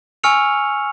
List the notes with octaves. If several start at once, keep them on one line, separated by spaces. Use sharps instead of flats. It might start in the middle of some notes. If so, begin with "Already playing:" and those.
G#5 C#6 E6 F6 C#7 F7